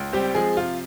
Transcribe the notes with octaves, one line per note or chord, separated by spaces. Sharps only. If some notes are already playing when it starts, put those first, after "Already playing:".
Already playing: C#2
G3 C4 G4
F3 G#3 G#4
C3 F4